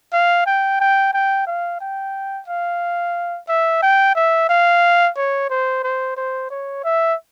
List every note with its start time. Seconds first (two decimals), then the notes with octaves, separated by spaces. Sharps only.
0.13 F5
0.46 G5
0.81 G5
1.14 G5
1.47 F5
1.81 G5
2.48 F5
3.49 E5
3.83 G5
4.16 E5
4.50 F5
5.17 C#5
5.50 C5
5.84 C5
6.17 C5
6.51 C#5
6.84 E5